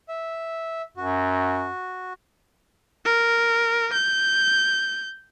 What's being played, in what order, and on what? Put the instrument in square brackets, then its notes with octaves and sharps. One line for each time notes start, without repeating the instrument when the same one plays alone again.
[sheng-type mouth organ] E5
[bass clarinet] F#2 [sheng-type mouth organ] F#4
[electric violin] A#4
G6